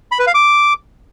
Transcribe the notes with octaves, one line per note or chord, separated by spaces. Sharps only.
B5
B4
F5
D6